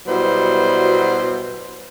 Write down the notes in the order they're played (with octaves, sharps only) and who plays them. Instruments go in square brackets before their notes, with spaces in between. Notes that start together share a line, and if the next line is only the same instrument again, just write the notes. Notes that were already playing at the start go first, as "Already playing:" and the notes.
[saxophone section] B2 F#3 G3 B3 E4 C5